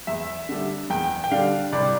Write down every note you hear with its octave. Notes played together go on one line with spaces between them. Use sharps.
E2 E5
D3 G3
E2 G5
G5
D3 G3 F5
C2 D5